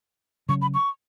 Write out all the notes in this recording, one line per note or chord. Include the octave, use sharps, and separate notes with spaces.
C#3 F#3 C#4 C#6
B5
C#6